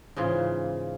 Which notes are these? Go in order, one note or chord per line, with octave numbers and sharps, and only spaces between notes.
G#2 C#3 E3 F4